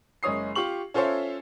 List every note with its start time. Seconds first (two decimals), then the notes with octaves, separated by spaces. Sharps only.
0.23 F#1 G#3 C#5 D#6 C7
0.55 F4 G4 C#6 F#7
0.94 C#4 F4 A4 C5 C#5 E5